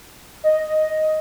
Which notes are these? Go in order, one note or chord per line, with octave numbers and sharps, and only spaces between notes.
D#5